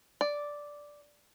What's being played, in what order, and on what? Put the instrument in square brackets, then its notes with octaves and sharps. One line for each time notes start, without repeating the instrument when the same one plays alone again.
[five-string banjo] D5